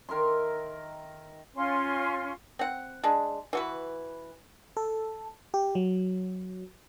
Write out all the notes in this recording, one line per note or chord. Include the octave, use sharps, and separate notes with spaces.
D#3 A#4 E5 C6
C#4 F4 C6
C4 F#5
G#3 D4
E3 F#4 B4
A4
G4
F#3